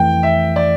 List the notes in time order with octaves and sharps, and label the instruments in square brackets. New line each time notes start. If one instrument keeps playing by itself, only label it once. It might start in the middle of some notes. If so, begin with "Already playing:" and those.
Already playing: [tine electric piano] F2 E3 A3 [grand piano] G5
[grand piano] E5
D5